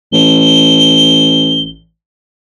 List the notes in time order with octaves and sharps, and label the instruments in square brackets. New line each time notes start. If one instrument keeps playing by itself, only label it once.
[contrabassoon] A1 [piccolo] G7